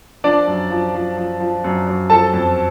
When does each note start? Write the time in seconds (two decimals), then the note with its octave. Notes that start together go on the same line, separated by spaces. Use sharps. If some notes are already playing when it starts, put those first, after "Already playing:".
0.24 F3 D4 D5
0.47 F#2
0.71 F3
0.95 F3
1.17 F3
1.40 F3
1.64 F#2
1.87 F#2
2.10 F3 A4 A5
2.33 F2